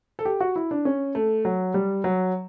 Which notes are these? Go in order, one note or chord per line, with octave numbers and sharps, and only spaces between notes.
A4
G4
F#4
E4
D4
C#4
A3
F#3
G3
F#3